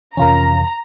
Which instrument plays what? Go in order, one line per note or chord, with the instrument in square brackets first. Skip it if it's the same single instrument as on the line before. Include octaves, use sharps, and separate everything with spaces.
[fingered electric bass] F2 C3 E3 [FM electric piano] C#4 F4 A#4 [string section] A#5